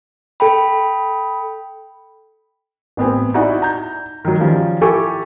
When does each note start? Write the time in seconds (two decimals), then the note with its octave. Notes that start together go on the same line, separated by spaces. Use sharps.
0.40 A4 G5 B5
2.97 A1 B3 C4 G#5
3.34 D#4 E4 F#4 D5 F#5 G#5
3.62 A#5 G6
4.25 D#3 F#3
4.40 D#3 F3 G3 C#4
4.81 E4 F4 G4 A4 G#5 C#6